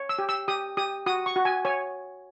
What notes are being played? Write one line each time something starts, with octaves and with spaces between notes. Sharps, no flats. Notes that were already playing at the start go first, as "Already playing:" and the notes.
Already playing: C#5
E6
G4
E6
G4 D#6
G4 D#6
F#4 D#6
C#6
F#4
G#5
C#5 G#5